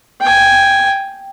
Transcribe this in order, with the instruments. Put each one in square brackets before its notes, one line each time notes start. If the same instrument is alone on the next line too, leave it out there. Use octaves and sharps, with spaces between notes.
[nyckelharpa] G5 G#5